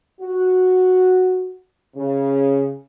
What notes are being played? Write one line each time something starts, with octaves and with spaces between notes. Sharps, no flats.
F#4
C#3